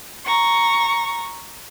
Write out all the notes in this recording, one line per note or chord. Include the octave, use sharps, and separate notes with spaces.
A#5 C#6